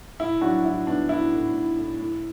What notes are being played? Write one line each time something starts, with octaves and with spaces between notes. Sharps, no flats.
A2 E4
F#3 D4 F#4
A2 E4
B3 D4
A2 E4
A2
A2
A2
A2